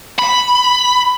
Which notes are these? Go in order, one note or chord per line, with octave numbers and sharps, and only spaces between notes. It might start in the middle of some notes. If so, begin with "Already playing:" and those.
B5